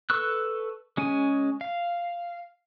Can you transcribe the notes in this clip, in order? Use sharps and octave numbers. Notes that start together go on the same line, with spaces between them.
A4 B4 C#6 E6 F#6
G#3 C#4 G#4 G#5
F5